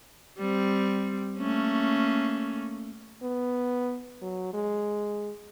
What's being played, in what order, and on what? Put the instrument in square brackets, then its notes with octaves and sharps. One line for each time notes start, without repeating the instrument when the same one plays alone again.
[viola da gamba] G3 C4
A3 A#3 C#4
[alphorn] B3
F#3
G#3